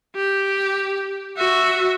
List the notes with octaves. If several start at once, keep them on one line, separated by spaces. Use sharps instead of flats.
G4
F#4 E5